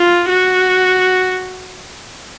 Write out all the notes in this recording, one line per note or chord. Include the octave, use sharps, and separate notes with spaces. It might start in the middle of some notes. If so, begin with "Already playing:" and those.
Already playing: F4
F#4